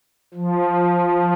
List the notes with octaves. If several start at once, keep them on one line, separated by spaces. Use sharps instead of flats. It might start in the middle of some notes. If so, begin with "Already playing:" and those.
F3